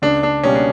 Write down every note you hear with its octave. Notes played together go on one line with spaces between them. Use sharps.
C#2 D4
D4
B2 G3 A#3 C#4
D4